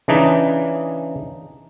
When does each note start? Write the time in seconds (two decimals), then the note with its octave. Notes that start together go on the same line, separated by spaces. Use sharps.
0.08 C#3 E3 D4 D#4